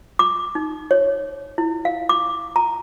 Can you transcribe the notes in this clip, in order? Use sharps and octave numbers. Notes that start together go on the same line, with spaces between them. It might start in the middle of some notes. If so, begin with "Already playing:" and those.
D6
D#4
C#5
E4
F5
D6
A#5